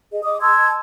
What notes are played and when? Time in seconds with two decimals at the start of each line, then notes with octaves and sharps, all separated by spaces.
0.12 G#4 D#5
0.23 D#5 D6 D#6
0.41 A5 C6 E6 G#6